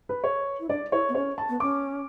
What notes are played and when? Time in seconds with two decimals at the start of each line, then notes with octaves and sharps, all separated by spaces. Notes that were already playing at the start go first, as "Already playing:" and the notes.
0.09 B4
0.24 C#5
0.60 E4
0.69 D4 D5
0.92 E4 C#5
1.09 B3
1.15 C#4 C#5
1.38 A5
1.49 B3
1.60 C#4 D6